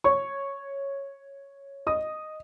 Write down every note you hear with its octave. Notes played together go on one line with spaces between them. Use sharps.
C#5 C#6
D#5 D#6